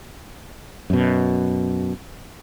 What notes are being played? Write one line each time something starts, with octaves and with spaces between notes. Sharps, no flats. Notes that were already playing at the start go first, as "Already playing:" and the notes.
F#2 B2